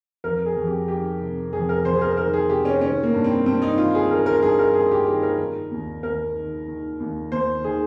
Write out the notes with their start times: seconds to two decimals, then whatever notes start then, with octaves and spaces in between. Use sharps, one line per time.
0.24 F2 A#4
0.46 G#4
0.56 F2
0.67 G4
0.88 D#3 G4
1.21 C3
1.53 F2 G#4
1.69 A#4
1.85 F2 C5
1.96 G#4
2.01 A#4
2.17 D#3 A#4
2.33 G#4
2.49 C3 G4
2.65 C#4
2.81 D#3 C#4
3.03 A#3
3.14 G2
3.24 C4
3.46 G2 C4
3.62 D#4
3.78 D#3 F4
3.95 G#4
4.10 D#3 A#4
4.26 A#4
4.42 G2 G#4
4.59 A#4
4.74 G2 G#4
4.91 G4
5.07 D#3 G4
5.23 A#4
5.39 D#3
5.71 D#2
6.03 D#2 A#4
6.36 D#3
6.68 D#3
7.00 D#2
7.32 D#2 C5
7.64 D#3 G#4